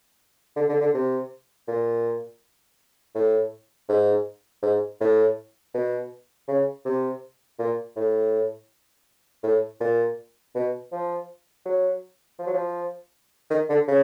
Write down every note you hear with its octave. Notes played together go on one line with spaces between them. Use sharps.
D3
D3
D3
C3
A#2
A2
G#2
G#2
A2
B2
C#3
C3
A#2
A2
A2
A#2
B2
F3
F#3
F3
F#3
F3
D#3
D3
C#3